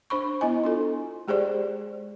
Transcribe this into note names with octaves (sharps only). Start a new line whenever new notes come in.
D4 C5 B5 C#6
B3 E4 D#5 G#5
D4 F4 A4
G#3 G4 G#4 C5 D5